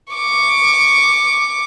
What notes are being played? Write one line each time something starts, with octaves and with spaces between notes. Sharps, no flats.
C#6 D6